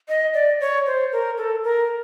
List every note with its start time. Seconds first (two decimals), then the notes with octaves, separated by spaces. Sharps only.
0.08 D#5
0.34 D5
0.61 C#5
0.86 C5
1.12 A#4
1.38 A4
1.64 A#4